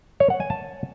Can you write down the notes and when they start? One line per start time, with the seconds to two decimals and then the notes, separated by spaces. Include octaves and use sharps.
0.20 C#5
0.30 F#5
0.40 G#5
0.50 A5